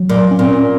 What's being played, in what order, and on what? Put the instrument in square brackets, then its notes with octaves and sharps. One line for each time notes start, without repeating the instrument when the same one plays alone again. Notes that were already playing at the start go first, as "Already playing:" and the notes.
Already playing: [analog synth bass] F#3
[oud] A#2
[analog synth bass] C#4
[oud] A#2 [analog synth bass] C4
[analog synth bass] C#4